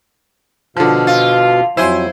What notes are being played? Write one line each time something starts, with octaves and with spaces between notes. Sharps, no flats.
B2 D3 F3 F5
F4
F2 F#3 E4 C5 G#5 C6